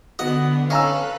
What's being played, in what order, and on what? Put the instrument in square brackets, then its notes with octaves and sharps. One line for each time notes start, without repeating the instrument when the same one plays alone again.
[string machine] D3 D4 [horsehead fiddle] B3 [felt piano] F#4 [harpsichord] D#5
[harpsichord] C#4 [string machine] A4 B4 F#6 [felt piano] D#5 A#5 E6 [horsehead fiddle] F5